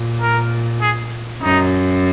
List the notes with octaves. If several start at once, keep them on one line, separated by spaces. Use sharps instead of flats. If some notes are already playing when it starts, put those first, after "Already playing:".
Already playing: A#2
A#4
G#4
F#2 D#4